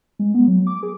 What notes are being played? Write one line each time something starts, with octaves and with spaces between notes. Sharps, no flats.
G#3
B3
F#3
D6
G#4